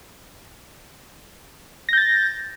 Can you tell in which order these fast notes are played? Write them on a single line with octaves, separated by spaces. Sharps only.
A#6 G6 A6